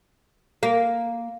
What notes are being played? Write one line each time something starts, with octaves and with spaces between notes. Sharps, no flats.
A#3